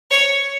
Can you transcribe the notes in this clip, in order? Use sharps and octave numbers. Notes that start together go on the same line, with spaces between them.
C#5